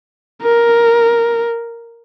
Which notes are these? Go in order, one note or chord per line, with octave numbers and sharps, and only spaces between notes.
A#4